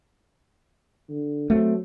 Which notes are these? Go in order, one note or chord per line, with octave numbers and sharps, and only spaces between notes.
D3
F#3 A3 C4